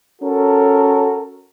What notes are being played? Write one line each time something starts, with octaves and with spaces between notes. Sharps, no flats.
C#4 F#4 A4 A#4